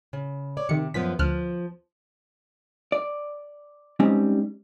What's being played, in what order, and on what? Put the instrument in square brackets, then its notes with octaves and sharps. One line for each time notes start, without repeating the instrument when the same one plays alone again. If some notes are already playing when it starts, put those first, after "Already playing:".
[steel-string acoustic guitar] C#3
C#5 D5
[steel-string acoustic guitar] C3 [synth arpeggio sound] D#3 C#7
[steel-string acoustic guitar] F#2 F3 B3 [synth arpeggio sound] B6
[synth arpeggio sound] D2 F6 F#6 [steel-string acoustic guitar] F3
[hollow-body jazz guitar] D5
G3 G#3 C4 C#4 D#4